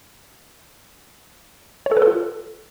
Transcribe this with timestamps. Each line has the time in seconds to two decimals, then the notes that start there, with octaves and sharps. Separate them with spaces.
1.86 C#5
1.91 A4
1.97 B4
2.02 A4
2.07 F4